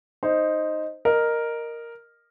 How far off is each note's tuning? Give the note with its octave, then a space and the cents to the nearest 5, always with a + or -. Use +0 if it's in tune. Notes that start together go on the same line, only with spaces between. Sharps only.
D#4 +0 C5 +0
A#4 +0 D#5 -20